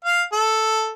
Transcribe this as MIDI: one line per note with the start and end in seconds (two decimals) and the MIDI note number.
0.04 0.22 77
0.32 0.91 69